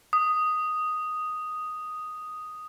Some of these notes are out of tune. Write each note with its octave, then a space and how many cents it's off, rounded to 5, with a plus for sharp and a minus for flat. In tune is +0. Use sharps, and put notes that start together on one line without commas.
D#6 +0